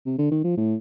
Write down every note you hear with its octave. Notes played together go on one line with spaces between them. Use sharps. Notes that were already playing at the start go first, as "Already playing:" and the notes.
C3
D3
D#3
F3
A2